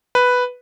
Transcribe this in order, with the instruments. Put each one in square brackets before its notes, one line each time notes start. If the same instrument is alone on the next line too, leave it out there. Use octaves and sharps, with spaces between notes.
[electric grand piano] B4